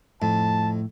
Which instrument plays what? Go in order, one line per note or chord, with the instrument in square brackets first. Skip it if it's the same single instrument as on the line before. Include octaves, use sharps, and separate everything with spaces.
[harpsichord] F2 [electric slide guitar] A2 [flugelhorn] A5